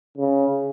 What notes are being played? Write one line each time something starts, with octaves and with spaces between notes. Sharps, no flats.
C#3